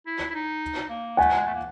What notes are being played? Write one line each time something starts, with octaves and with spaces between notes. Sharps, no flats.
E4
E4
D#4
A#3
A3 F#5 G#5
G#3
A3
A#3